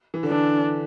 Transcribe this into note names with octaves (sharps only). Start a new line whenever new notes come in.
E3
D3
E3 D4